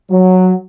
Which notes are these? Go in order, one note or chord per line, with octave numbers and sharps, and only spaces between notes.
F#3